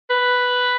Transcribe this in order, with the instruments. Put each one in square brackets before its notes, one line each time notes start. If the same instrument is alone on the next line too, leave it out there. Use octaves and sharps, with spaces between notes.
[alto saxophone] B4